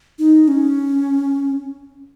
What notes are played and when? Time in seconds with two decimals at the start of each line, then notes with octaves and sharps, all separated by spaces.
0.19 D#4
0.48 C#4